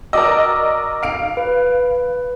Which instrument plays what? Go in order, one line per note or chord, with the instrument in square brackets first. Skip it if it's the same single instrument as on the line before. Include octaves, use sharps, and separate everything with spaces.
[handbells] F#4 D6 E6 [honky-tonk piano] A#4 D5 D#5
[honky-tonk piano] F5 D7
[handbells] B4